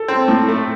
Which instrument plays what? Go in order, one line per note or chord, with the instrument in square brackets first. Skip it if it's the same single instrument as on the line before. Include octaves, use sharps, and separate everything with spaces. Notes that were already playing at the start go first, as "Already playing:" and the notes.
Already playing: [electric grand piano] A4
[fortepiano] C4
A2
A3